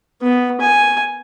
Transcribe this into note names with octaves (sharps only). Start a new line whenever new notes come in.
B3
G#5